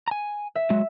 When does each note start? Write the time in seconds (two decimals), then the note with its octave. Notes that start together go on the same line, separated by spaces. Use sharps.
0.08 G#5 A#5
0.55 E5
0.70 F#3 G#3